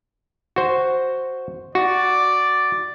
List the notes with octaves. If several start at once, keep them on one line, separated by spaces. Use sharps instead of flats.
F#4 C5
F#4 D5